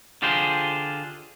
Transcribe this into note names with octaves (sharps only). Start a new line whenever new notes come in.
D3 F4 G4 G#4 C5